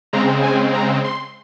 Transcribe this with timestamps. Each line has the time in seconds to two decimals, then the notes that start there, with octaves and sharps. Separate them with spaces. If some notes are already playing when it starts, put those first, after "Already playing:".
0.13 C#3 G#3 C4 A#5
0.43 G#5
0.74 A#5
1.04 C6